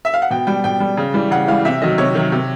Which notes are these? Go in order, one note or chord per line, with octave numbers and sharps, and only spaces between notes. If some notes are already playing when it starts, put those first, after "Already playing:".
E5
F5
F#5
B2 G5
G3 G5
B2 G5
G3
C#3
E3 G3
C#3 F#5
E3 G3 F5
C3 E5
D#3 F#3 D#5
C3 C#5
D#3 F#3
C3